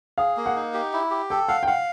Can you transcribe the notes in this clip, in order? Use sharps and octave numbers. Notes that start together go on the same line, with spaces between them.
G#4 F5
A#3
F#5
D#4
G4
E4
G4
A4 G5
F5 F#5
G5
F5 F#5